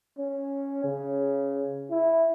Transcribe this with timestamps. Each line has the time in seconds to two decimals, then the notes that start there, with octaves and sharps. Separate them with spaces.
0.18 C#4
0.84 C#3
1.90 E4